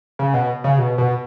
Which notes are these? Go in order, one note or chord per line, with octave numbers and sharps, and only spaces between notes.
C#3
B2
C#3
B2
B2